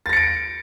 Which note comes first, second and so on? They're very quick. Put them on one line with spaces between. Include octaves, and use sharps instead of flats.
A6 A#6 C#7 D7